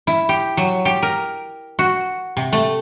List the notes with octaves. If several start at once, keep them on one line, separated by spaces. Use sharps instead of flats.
E4
G4
F#3
G4
A#4
F#4
C3
A3